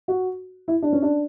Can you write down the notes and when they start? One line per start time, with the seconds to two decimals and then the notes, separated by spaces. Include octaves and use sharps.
0.08 F#4
0.68 E4
0.82 D4
0.93 C#4
1.02 D4